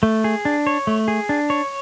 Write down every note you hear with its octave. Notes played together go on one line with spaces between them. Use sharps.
A3
G#4
D4
C#5
A3
G#4
D4
C#5